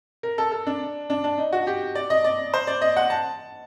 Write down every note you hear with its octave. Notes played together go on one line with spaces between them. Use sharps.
A#4
A4
A4
D4
D4
D4
D#4
F#4
G4
D5
D#5
D5
C5
D5
D#5
F#5
A5